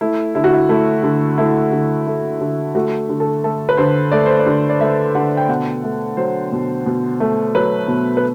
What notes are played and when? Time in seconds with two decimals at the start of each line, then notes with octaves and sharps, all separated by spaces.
0.01 A3 E4
0.35 D3 E4
0.44 F#4
0.53 E4
0.69 A3 E4
1.03 D3
1.38 A3 E4
1.72 D3
2.07 A3
2.41 D3
2.75 A3 F#4
3.09 D3
3.20 A4
3.44 A3 A4
3.69 B4
3.77 D3 C5
4.11 A3 D5
4.26 C5
4.39 D5
4.46 D3
4.70 D5
4.81 A3 E5
5.15 D3 F#5
5.37 G5
5.49 B2 F#5
5.84 A3
6.17 F#3 C5
6.52 B2
6.86 B2
7.20 A3
7.55 F#3 B4
7.88 B2
8.17 B4